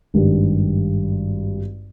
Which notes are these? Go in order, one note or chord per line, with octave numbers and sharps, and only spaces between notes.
G#1 G2 D#3 G3